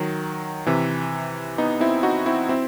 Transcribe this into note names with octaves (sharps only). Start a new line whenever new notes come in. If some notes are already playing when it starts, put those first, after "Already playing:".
Already playing: D#3 F#3
C3 E3
B3 D#4
C4 E4
D#4 F#4
C4 E4
C4 E4